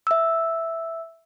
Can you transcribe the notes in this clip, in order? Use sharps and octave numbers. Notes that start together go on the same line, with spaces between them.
E5 E6